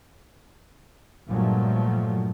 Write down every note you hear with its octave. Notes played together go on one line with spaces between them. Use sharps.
G2 A#2 F3 F#3 A3